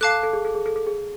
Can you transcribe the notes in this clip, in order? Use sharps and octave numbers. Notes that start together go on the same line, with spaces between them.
A4 F5 A5 D6 F#6
A4
G#4
A4
G#4
A4
A4
G#4